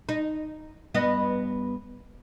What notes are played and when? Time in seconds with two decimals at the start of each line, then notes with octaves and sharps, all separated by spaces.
0.09 D#4
0.94 G2 B3 D#5